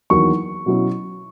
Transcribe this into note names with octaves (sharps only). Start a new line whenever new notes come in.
E2 D#3 F#3 A#3 D#4 C#6
B2 F#3 C#4 E4